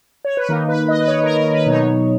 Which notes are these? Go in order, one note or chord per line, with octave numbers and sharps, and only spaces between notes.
C#5
B4
D#3 A#3 D#4 A#4
B4
D#5
B4
C#5
A#4
A#4
B4
B2 F#3 B3 D#4 C#5